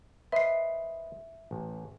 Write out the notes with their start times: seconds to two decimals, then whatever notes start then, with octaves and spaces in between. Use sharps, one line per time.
0.32 B4 C5 D#5 E5 C7
1.51 A1